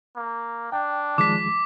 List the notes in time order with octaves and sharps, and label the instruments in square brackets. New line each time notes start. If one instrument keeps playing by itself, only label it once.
[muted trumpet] A#3
[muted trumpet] D4 [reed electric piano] G5
[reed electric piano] D#3 F3 G#3 [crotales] D6 B6